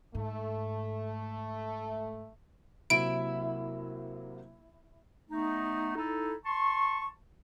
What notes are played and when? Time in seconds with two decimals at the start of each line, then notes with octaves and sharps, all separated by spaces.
0.15 G#2 A3
2.90 C3 F#3 A#3 E4 D7
5.29 A3 B3 D#4
5.97 D#4 E4 A4
6.46 A5 C6 C#6